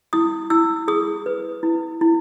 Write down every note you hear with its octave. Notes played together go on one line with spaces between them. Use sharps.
E4 D#6
E4 E6
G#4 D#6
B4
E4
E4